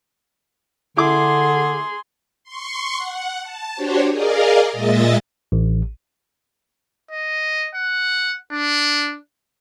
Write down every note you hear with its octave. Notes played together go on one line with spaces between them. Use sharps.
D3 E4 G#4 C6 D6
C6 C#6
F#5
A5
D4 F#4 G4 C5 C#5
G#4 A#4 D5 D#5 F5
A#2 G#3 D#5 E5 A6
A1
D#5
F#5
D4